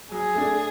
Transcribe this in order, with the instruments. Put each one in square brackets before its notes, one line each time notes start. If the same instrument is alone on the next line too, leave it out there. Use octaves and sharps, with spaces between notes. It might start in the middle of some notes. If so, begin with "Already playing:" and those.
[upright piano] F#3 [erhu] G#4
[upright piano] A3 D4